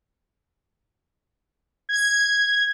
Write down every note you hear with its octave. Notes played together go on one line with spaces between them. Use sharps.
G#6